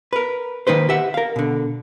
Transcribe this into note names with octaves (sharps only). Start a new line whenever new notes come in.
A#4 B4
D#3 A#3 D#4 B4 C5
G4 E5 F#5
A#4 F5
B2 D3